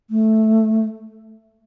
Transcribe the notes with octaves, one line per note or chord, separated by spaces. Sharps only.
A3